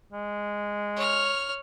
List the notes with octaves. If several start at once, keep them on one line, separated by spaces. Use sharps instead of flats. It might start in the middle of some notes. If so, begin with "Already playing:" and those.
G#3
C#5 F6